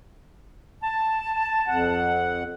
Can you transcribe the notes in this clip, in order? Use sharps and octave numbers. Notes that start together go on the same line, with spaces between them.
A5
F2 F#5